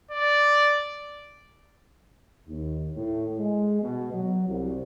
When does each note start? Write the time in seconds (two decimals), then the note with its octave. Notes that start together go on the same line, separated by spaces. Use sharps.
0.11 D5
2.48 D#2
2.95 A2
3.38 G#3
3.82 B2
4.13 F#3
4.48 C2